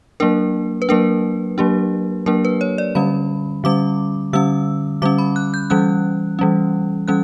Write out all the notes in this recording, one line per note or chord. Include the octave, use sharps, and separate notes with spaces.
F#3 A#3 D4 A#4
B4
F#3 A#3 D4 A#4
F#3 A#3 D4 G4
F#3 A#3 D4 A#4
B4
C#5
D5
D3 G3 C#4 B5
D3 G3 C#4 D6
D3 G3 C#4 E6
D3 G3 C#4 D6
B5
F#6
G6
E3 G3 C#4 F#6
E3 G3 C#4
E3 G3 C#4 F#6